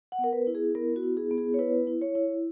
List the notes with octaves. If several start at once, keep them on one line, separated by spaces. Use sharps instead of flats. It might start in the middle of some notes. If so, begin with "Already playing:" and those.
F#5
B3
A#4
B4
E4
G#4
B3 A#4
F#4
E4
G#4
B3
G#4
C#5
E4 B4
E4
C#5
E4